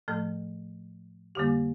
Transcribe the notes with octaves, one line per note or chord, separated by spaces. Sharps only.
A2 F3 A3 A4
F2 D3 G3 A#3 G4